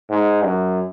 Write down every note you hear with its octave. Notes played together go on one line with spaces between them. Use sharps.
G#2
F#2